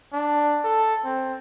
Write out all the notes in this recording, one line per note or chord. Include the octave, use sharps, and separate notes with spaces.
D4
A4
C4